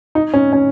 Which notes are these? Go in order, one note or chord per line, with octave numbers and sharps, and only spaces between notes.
D#4
C#4
C#4